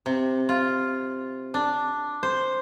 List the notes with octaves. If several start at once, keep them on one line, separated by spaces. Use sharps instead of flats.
C3
F4
D4
C5